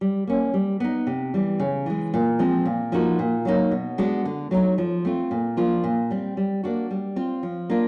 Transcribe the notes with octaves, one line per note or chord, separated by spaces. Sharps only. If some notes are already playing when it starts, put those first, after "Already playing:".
G3
A#3 C#4
G3
B3 D#4
C3
E3 G3
C#3
E3 G#3
A#2
F3 G#3 C4
A#2
F3 A#3 D#4 F#4
A#2
F#3 A#3 D#4
B2
G#3 B3 D4 F#4
D3
F#3 A3 C4 D#4
F3
A3 C4 F4
A#2
F3 A#3 D4 F4
A#2
G3 C4
G3
A#3 D4 F#4
G3
C4 F4
F3
A#3 D4 F4